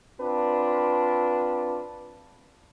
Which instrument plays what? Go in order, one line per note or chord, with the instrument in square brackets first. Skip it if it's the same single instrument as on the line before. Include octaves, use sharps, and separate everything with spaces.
[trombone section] C4 D4 F4 B4